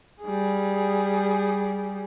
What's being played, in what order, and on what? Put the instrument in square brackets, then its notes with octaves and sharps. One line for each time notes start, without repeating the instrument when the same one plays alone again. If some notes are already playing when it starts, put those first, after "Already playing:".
[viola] G3 G#4